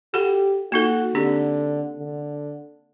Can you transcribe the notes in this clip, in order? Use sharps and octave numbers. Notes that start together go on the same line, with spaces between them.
F#4 G4 A4 F#5
A#3 D#4 F#4 A4
D3 C4 D4 G4
D3